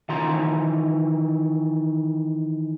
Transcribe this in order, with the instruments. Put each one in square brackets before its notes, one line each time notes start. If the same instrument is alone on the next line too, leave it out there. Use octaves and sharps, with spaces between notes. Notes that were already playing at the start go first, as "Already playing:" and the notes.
[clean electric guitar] D#3 E3 F4 A#5 C6